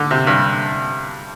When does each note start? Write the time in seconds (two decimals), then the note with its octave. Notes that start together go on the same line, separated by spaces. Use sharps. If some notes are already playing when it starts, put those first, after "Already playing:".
Already playing: D3
0.11 C3
0.27 G2